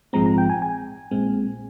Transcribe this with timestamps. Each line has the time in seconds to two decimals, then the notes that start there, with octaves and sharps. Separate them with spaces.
0.13 A#1 G#2 F3 G#3 C4 A#5
0.26 A#5
0.38 G5
0.50 G#5
0.62 G#5
1.11 A#1 A#2 G#3 C4